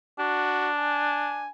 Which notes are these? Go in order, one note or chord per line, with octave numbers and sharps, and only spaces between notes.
D4 F#4
G#5